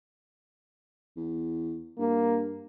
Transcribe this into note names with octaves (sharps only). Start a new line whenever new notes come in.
E2
G2 A#3